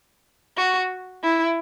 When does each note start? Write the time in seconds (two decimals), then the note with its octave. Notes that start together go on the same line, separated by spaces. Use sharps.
0.57 F#4
1.23 E4